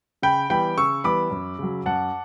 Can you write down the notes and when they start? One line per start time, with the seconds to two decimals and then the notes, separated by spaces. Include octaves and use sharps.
0.22 C#3 G5 B5
0.50 E3 G3 B3 G5 B5
0.78 C#3 C#6 E6
1.04 E3 G3 B3 B5 D6
1.31 F#2
1.59 C#3 F#3
1.86 F#2 F#5 A5